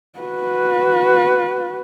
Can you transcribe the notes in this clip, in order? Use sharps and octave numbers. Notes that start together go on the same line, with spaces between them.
F#4 B4